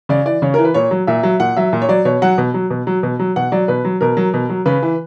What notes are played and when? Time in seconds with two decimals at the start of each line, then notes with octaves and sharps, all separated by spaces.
0.09 C#3 D5
0.26 E3 D5
0.42 C#3 C#5
0.54 E3 A#4
0.64 B4
0.74 A#2 C#5
0.91 F#3
1.07 A#2 E5
1.23 F#3
1.40 A#2 F#5
1.56 F#3 E5
1.73 A#2
1.82 C#5
1.89 F#3 D5
2.05 B2 C#5
2.22 F#3 F#5
2.38 B2
2.54 F#3
2.70 B2
2.87 F#3
3.03 B2
3.19 F#3
3.36 B2 F#5
3.52 F#3 D5
3.68 B2 B4
3.85 F#3
4.01 B2 A#4
4.17 F#3
4.34 B2
4.49 F#3
4.66 C#3 B4
4.83 E3